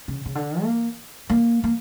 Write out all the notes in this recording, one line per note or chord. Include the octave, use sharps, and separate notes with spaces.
C#3
C#3
D3
A#3
A#3
A#3